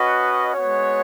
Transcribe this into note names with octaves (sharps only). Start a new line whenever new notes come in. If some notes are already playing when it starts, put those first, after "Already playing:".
Already playing: C#4 F#4 B4 D#5 F#5
G#3 B3 F#4 C#5